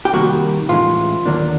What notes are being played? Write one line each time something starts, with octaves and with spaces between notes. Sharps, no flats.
G4
F2 C3 D#3 G3 A#3 F#4
A2 E3 G#3 C#4 F4
D#2 D3 F#3 A#3 D4